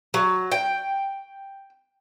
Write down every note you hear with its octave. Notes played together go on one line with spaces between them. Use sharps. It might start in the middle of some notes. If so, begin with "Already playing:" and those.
F#3
G5